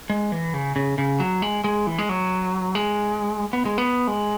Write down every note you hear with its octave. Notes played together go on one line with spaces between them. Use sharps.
G#3
E3
C#3
C#3
C#3
F#3
G#3
G#3
E3
G#3
F#3
G#3
B3
G#3
B3
G#3